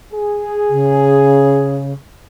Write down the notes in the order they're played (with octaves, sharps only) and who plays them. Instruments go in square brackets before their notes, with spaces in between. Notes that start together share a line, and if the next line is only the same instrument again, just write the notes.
[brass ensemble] G#4
[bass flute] C#3